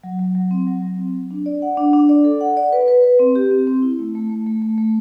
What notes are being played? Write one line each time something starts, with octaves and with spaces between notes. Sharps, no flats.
F#3
F#3
F#3
C4
F#3
F#3
C4
F#3
D4
D5
F#5
D4
D4
D5
A4
F#5
D5
B4
B4
B4
C4
G4
C4
C4
E4
A3
A3
A3
A3
A3
A3